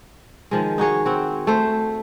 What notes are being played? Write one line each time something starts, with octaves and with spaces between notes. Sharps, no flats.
D#3 F3 G#3
D#4 F#4 G#4 C#5
C4 F#4
A3 C5